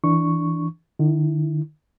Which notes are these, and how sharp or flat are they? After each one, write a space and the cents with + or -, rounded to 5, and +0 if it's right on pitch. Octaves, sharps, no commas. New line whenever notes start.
E3 -10 D4 +0 C#6 +0
D#3 -45 E4 +0